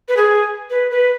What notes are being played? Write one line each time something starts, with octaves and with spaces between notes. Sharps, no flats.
B4
G#4
B4
B4